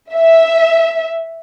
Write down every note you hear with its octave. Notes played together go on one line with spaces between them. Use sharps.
E5